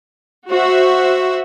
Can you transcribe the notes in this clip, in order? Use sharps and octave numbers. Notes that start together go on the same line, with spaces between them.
F#4 C5 E5